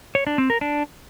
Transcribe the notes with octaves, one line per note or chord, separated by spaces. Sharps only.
C#5
D4
C4
A#4
D4